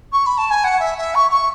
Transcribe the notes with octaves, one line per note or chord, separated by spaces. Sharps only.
C#6
B5
A5
G#5
F#5
E5
E5
C#6
C#6